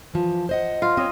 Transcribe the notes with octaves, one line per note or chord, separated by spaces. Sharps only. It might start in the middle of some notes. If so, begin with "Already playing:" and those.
E3 F3
C5 D#5 F#5
F4
C4 C#5 D#5